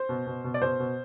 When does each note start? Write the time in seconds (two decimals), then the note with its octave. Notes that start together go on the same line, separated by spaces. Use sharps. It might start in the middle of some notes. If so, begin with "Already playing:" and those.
Already playing: C5
0.09 B2
0.26 B2
0.44 B2
0.54 D5
0.62 B2 C5
0.80 B2